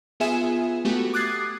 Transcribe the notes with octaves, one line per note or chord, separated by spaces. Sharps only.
B3 F4 G#4 E5 G#5 E7
A3 B3 F#4 G4
D6 D#6 F#6 G#6 A6 C7